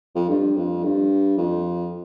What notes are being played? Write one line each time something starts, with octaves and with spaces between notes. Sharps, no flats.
F2
G2
F2
G2
F2